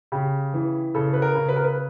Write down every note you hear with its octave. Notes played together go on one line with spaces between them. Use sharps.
C#3 G4
E3
C#3 A4
B4
A#4
C#3
B4
A#4
B4